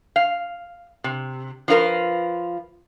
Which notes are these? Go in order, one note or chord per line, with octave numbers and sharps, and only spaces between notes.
F5
C3
F3 D#4 F4 A#4 B4